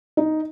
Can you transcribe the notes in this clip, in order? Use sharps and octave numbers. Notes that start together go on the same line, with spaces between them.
D#4